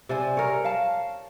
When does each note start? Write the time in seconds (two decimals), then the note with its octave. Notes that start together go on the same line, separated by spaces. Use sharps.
0.09 C3 C5 D5 G#5
0.37 A#4 C#5
0.65 F5 A5